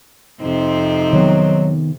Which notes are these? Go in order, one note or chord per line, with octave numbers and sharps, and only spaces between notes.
F2 C3 C4 D#4
D#3 F#3 B3